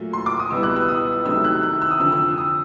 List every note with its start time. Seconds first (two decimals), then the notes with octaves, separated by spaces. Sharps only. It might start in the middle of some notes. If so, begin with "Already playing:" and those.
Already playing: A#2 F#3 A3
0.13 C6
0.26 D6
0.39 D#6
0.51 C#2 B2 G3 B3 E4 E6
0.63 F#6
0.76 E6
0.88 D#6
1.25 C3 D#3 F#3 A3 E6
1.44 F#6
1.63 F#6
1.82 E6
1.90 D#6
2.00 F2 D3 F3 E6
2.12 E6
2.38 D#6